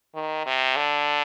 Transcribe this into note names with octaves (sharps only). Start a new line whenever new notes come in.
D#3
C3
D3